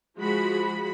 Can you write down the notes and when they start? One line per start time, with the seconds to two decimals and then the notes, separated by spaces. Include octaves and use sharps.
0.18 F3 G#3 F#4 B5